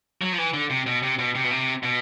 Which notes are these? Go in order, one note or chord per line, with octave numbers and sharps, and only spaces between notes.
F#3
F3
E3
D3
C3
B2
C3
B2
C3
B2
C3
B2